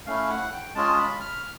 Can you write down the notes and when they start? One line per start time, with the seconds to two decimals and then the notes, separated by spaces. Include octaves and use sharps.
0.06 A3 C#4 E4 F5
0.30 F#5
0.52 G5
0.75 G#3 C#4 F4 G#4 A5
0.98 B5
1.21 F6